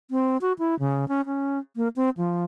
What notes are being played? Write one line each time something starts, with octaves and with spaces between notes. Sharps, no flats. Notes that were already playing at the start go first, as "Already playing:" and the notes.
C4
F#4
E4
C#3
C#4
C#4
A#3
C4
F3